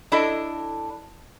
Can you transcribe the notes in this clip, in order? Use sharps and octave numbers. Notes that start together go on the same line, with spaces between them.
D4 E4 A4 D#5